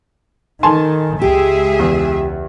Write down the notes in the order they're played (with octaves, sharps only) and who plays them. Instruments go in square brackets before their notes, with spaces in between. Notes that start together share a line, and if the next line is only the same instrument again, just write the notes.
[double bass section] D#3 [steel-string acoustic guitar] A4 [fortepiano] G#5 A5 C6
[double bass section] C#2 [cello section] G#3 G#4 E5 [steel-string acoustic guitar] G4
[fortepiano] E2